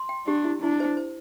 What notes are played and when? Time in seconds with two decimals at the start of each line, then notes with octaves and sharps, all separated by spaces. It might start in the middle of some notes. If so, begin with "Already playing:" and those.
Already playing: C6
0.09 G5
0.27 D4 G4
0.44 E4
0.62 D4 E4
0.80 C5
0.97 C5